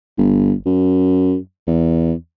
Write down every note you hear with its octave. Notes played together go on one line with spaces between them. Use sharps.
G1
F#2
E2